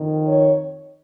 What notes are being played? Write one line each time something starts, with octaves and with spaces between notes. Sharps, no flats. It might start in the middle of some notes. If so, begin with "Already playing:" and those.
Already playing: F2 D#3
C#5